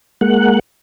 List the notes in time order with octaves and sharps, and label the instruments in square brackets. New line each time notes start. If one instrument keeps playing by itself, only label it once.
[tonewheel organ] G#3 A#3 F#5